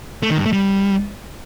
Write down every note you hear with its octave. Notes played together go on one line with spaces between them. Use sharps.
A3
D#3
G2
A3
G3